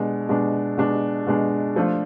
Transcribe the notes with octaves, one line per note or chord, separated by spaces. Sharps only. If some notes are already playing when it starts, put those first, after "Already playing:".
Already playing: B2 G#3 D4
B2 G#3 D4
B2 G#3 D4
B2 G#3 D4
F3 A3 D4 F4